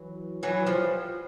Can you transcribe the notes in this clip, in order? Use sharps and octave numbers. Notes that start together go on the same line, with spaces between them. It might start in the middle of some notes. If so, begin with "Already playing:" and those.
Already playing: E3 F#3
E3 F#3
F3 G3